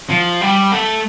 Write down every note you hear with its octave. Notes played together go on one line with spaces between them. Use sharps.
F3
G3
A3